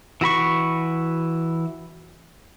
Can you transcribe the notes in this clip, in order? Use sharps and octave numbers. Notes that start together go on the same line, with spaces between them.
E3 F#4 B5 C#6